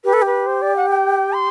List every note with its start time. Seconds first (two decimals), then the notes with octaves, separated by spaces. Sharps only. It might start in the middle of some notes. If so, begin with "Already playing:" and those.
0.04 G4 B4
0.13 A4
0.22 G4 B4
0.46 C5
0.62 D5
0.76 F#5
0.89 G5
1.33 C6